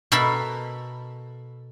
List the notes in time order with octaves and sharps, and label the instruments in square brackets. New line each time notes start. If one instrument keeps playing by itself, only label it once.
[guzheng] B2 A4 A#4 E5 B5